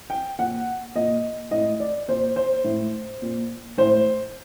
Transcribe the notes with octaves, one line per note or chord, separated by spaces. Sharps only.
G5
A#2 F#5
A#2 D#5
A2 D#5
D5
A#2 C5
C5
A2
A#2
A2 C5